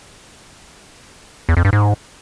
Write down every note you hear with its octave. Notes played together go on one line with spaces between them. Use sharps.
E2
F2
G2
G#2